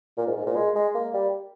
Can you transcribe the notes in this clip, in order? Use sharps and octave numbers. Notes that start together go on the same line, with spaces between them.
A#2
G#2
G#2
A#2
G#3
G#3
A#3
G3